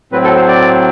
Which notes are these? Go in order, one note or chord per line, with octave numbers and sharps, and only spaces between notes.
A2 F#3 C4 B4
A4
C5
D5